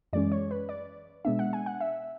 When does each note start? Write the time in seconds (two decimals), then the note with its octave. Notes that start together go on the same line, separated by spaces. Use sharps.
0.13 F#2 E3 G#3 C#4 D5
0.32 C#5
0.51 B4
0.69 D5
1.25 B2 G#3 B3 D4 E5
1.39 F#5
1.53 G#5
1.66 F#5
1.80 E5